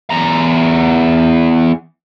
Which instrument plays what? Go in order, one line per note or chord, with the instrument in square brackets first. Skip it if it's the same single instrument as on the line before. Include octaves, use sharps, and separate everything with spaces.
[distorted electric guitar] E2 A#5